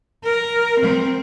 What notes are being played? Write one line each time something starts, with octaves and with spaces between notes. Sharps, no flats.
A#4
C4